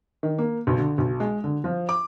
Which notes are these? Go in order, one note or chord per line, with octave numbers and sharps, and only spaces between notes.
D#3
A#3
B1
D3
B1
G#3
D3
F3
D6